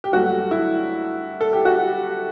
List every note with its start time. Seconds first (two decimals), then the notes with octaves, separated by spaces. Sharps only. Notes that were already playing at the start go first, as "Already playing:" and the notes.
0.04 G4
0.12 G2 F#3 A3 F#4
0.51 E4
1.41 A4
1.53 G4
1.65 F#4